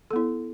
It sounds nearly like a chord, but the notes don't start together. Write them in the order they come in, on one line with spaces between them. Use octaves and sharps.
A4 B3 E4